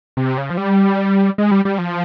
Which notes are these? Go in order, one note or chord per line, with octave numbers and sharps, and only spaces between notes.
C3
C#3
F3
G3
G#3
G3
G3
F3